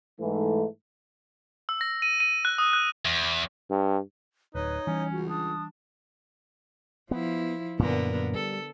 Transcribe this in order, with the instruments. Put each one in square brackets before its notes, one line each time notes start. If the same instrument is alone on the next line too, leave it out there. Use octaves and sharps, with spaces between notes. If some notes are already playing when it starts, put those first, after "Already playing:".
[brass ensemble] G#2 E3 A3
[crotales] E6
A#6
D#7
D#7
F#6
D#6
F#6
[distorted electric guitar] E2
[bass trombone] G2
[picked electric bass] D1 [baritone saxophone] D#4 [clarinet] B4 [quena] C#5
[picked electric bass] E3 G3 [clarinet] C#4
[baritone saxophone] C#2 [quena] F#4
[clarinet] D4 [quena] D#6
[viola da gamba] F3 E4 [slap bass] B3
[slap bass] F#2 A#2 [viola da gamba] D3 B3 A#4
[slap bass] G3 [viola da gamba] A4